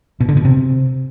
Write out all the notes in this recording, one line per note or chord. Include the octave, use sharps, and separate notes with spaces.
B2
D3
B2
C3